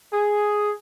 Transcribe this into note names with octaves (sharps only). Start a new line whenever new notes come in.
G#4